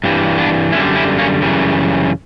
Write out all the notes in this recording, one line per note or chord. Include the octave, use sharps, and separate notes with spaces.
G2 E3 G3
B3 D4
F#2 D3 G3 C#4 E4
C#4 E4
A#3 C#4
F#2 C#3 E3 G3